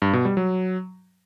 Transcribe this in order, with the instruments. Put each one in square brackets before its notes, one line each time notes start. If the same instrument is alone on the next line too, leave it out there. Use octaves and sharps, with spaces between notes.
[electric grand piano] G2
B2
G3
F#3